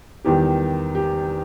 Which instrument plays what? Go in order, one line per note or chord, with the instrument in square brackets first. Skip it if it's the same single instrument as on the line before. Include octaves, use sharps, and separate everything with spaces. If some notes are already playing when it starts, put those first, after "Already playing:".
[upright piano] E2 D#3 G3 G4
G4